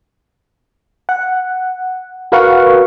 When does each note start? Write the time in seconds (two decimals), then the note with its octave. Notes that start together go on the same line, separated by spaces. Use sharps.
1.09 F#5
2.32 F#4 A#4 B4 F5 F#5 C#6